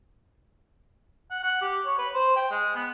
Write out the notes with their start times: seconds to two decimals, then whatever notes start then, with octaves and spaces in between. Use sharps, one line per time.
1.31 F#5
1.43 F#5
1.61 G4
1.85 C#5
1.98 B4
2.14 C5
2.36 G5
2.51 G#3
2.75 B3